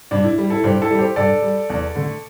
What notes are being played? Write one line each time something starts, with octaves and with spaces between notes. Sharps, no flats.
G2 D4
E4
G3
E4 A4
G2 G4 C5
E4 A4
G3
G4 C5
G2 A4 D5
G3
E2
D3 A3